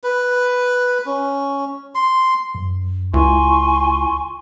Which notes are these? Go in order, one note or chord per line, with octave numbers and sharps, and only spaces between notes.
B4
C#4
C6
F#2
C#2 E4 F4 G#5 C6 C#6